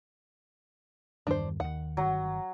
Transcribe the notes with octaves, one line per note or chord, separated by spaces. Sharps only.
E2 G2 D#3 D4 C5
D#2 D#3 F#5
G1 D#3 F#3